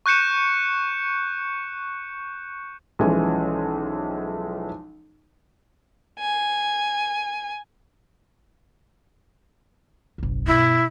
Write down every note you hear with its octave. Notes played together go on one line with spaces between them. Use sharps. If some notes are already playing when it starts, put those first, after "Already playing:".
C#6 F#6 G6 C#7 E7
B1 E3 F3 G#3 C#4 G#5
G#5
F#1 B1
G2 B2 E4